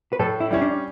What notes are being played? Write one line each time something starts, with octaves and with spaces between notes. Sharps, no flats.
B4
A2 A4
E4
G3 C#4 E4
D4